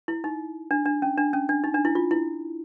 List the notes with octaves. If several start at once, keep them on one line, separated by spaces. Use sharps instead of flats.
E4
D#4
D4
D4
C#4
D4
C#4
D4
D#4
D4
E4
F4
E4